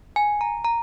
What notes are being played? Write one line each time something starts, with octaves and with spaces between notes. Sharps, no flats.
G#5
A#5
A#5